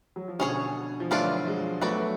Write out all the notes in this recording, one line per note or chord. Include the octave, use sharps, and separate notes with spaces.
F#3
F3
B2 D3 C#4 G#4 C#5
F3
D3 F#3 A3 D4 F4 B4 D5
F3 G#3
F#3 A3 B3 F#4 B4 D5